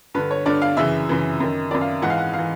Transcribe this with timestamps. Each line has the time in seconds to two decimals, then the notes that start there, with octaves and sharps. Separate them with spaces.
0.14 G2 D3 B4
0.31 C#5
0.46 G2 D3 D5
0.62 F5
0.77 F#2 C#3 E3 E5
1.09 F#2 C#3 E3
1.40 F#2 D#3
1.71 F#2 D#3 D5
1.81 F5
2.02 G#2 E3 F#5
2.10 F5
2.18 F#5
2.33 E3 F5